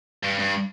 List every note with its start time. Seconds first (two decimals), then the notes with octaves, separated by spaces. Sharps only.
0.23 G2
0.39 G2